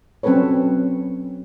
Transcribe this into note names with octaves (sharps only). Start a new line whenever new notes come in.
F#3 C4 C#4 A4 B4 C#5